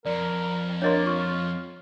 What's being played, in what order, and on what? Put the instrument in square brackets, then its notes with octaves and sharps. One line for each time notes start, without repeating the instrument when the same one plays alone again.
[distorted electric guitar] F2 [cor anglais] A#4 [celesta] D5
[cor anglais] A#3 [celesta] D4 A#4 [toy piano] C#5 D#5 C6
[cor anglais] F4 [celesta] C#6